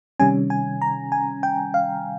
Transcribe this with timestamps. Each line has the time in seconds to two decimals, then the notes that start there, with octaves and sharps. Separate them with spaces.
0.20 C3 D#3 G3 C#4 G#5
0.50 G#5
0.81 A#5
1.12 G#5
1.43 G5
1.74 F5